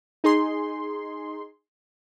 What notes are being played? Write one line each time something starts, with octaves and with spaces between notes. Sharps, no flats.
D#4 G#4 C6